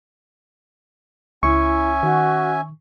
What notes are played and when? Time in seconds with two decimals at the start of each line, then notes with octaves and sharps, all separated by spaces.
1.43 C#2 C#4 E4 E5 G#5 C#6
2.03 D#3 F#4